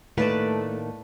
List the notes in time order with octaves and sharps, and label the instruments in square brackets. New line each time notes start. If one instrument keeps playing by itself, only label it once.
[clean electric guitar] A2 D#3 A#3 [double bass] A3 [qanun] B4 D5 A5